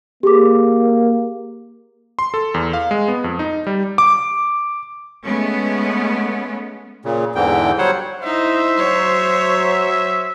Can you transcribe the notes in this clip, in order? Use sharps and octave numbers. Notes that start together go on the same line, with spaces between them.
A#3 G4 G#4 D6
C6
A4
E2
F5
G#3
B3
F2
D#4
G3
D6
G#3 A3 B3 C#4
A#2 C#3
E2 G#2 D3 E3 G5
F#3 G3 C5 C#5 F#5
D#4 E4 C5 E5
F#3 C#5